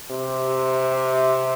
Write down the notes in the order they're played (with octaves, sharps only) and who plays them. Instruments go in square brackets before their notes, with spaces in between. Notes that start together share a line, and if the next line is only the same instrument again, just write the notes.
[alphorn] C3